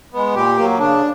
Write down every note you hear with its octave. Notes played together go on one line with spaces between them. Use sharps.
G#3 B3
A#2 G4
F#3 A#3
C#3 D4